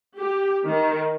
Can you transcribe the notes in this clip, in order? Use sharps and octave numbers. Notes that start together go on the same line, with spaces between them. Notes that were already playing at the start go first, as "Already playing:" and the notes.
G4
D#3